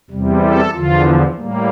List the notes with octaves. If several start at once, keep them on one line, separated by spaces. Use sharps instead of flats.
E2 C3 G3
A4
E2 D3 F3 F4
A2 G3 A#3